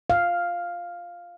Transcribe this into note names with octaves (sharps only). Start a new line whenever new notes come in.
F5